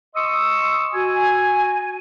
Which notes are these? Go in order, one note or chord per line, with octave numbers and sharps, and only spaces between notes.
D#5 C6 C#6 D#6 E6
F#4 G#5